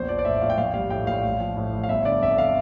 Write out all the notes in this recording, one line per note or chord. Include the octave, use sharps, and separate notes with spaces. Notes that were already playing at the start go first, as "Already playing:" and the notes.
Already playing: A#1 E2 C5
F3 D5
D5
A2 E5
A#1 F5
G5
A#1 F5
G3 F5
A2 G5
A#1 F5
A1
F3
A2
A1
F5
G1 E5
D3 D5
F2 E5
F5